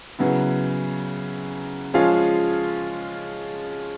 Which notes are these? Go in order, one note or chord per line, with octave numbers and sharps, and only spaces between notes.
C#3 F#3 B3 E4
F3 G#3 C#4 F4 G#4